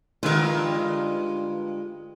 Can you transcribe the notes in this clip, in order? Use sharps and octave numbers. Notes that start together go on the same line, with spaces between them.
G2 D3 G#3 F4 A#4